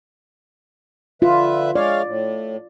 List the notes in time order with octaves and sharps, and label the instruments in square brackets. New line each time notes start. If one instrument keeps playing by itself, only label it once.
[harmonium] D3 B4 E5 [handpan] F4
[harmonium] G#3 C#5 F5 [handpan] D5
[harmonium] A2